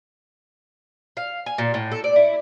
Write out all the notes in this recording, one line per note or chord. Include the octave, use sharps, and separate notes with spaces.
F5
G#5
A#2
A2
A4
D5
E4